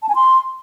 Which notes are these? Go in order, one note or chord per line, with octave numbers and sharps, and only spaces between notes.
A5
G#5
C6